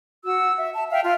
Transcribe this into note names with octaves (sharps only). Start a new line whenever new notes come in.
F#4 E6
E5
A5
E5 F5 G5
F4 F5